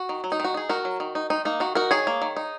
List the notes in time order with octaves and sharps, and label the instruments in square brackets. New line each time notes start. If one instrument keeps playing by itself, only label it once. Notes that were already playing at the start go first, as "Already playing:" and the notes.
Already playing: [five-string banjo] F#4
D#3
F#3
D#4
D#3 F#4
D#4 G#4
D#3 F#4 A#4
F#3
D#3
D#4
D#3 D#4
A#3 D#4
D#3 F#4
D#4 F#4 A#4
D#3 G#4 C#5
A#3
D#3
D#4